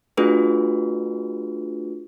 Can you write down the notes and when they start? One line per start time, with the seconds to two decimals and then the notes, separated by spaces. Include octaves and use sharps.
0.17 A3 D4 F4 F#4 G#4 B4